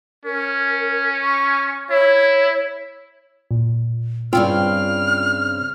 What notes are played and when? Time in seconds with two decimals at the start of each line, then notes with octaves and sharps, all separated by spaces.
0.25 C#4 A#4
1.23 C#6
1.90 E4 C#5
3.51 A#2
4.33 G2 C#3 C4 F4 G5 F6